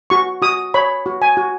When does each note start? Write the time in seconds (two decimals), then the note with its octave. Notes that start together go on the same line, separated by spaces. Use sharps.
0.10 F#4 C#6
0.42 F#4 D#6
0.74 C#5 B5
1.06 F#4
1.22 G#5
1.37 F#4